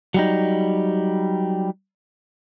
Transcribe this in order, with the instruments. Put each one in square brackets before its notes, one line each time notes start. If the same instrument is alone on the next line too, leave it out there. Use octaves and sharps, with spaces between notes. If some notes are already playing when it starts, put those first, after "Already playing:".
[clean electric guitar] F#3 G3 D#4